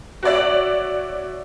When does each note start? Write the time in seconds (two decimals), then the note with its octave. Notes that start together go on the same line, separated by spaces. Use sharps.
0.23 F#4 C#5 D5 E5